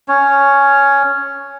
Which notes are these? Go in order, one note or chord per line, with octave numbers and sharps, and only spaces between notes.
C#4 C#5